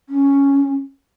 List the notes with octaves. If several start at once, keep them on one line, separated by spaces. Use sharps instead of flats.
C#4